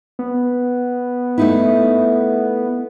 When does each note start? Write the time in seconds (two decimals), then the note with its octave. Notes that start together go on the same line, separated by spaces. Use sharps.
0.19 B3
1.38 A3 D#4 E4